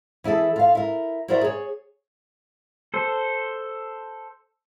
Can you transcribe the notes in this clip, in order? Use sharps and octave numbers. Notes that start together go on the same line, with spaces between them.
E3 E4 G#4 A4
F4 F5
E4 A#4
E4 F#4 A#4 C5 D5 E5
G#4 C#5
A4 C5